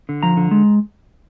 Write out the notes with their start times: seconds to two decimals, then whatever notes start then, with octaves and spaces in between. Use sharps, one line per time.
0.09 D3
0.23 F3 A#5
0.37 D3
0.51 G#3